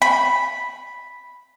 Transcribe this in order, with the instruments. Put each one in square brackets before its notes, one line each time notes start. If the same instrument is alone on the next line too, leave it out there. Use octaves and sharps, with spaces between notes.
[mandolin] B5